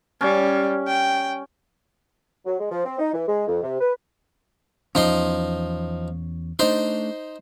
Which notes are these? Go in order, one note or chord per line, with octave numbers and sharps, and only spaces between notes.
G3 C#4
G5
F#3
G#3
F3
C4
D#4
E3
G#3
F2
C3
B4
E2 F3 C#4 D#4 C6
A3 D4 D#4 C5 C6